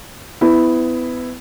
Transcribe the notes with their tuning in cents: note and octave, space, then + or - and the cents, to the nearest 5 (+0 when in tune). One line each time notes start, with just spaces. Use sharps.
B3 +30 E4 +0